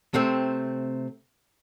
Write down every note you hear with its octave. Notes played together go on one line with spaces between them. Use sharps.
C3 A3 C4